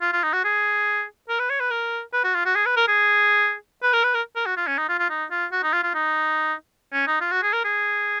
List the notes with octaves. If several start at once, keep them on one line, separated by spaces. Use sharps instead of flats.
F4
F4
D#4
F#4
G#4
A#4
B4
C#5
B4
A#4
B4
F#4
F4
F#4
G#4
B4
A#4
G#4
B4
A#4
B4
A#4
A#4
F#4
F4
C#4
D#4
F4
F4
D#4
F4
F#4
D#4
F4
F4
D#4
C#4
D#4
F4
F#4
G#4
A#4
G#4